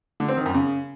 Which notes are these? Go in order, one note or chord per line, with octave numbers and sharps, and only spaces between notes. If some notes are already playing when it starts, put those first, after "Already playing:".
D3
C4
D#3
F#2
C#3